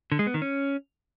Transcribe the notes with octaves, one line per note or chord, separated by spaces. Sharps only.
D3
G#3
B3
D#3
C#4